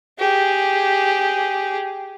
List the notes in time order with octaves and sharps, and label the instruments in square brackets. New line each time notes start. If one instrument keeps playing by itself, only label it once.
[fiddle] G4 G#4